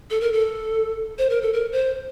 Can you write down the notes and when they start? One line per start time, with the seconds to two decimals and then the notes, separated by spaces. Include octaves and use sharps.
0.10 A4
0.21 A#4
0.33 A4
1.18 C5
1.30 A#4
1.42 A4
1.53 A#4
1.72 C5